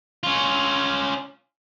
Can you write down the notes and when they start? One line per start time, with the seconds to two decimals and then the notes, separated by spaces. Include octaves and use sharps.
0.23 C#4 F4